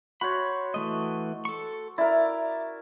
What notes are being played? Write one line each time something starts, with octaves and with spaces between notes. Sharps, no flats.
F#4 C5 C#5 B5
E3 A3 D#5
A4 C#6
E4 A#4 D5